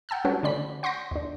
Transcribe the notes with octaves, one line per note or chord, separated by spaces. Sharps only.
F#5 G5 A5 E6 F6
G3 C#4 F#4 A4 B4 C#5
D3 A3 C#4 D5 B5 B6
F#5 C6 C#6 G6 A#6 D7
D#2 D4